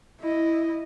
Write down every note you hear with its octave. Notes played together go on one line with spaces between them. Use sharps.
E4 D#5